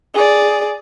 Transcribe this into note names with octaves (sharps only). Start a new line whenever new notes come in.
G#4 D5